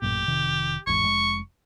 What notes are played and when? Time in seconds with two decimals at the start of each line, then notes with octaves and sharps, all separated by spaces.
0.02 A1 F#2 A#2 G4
0.28 F1 C3 D#3
0.87 G#1 E2 G#2 C#6
1.04 F1 G#3